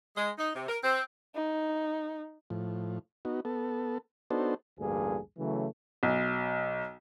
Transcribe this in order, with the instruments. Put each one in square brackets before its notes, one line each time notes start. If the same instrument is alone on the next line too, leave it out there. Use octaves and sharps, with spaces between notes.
[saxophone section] G#3
D#4
C3
A#4
C4
[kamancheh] D#4
[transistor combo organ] A2 F3
B3 D#4 F#4
B3 A4
B3 D4 D#4 F#4 A4 C5
[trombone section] A1 D2 G2 A#3 G#4
C#3 E3 F#3 A3
[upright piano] B1